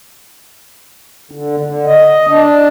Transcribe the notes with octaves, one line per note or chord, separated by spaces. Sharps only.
D3
D3
D#5
D4